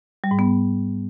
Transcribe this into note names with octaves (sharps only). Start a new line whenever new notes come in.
G3
G#2
B3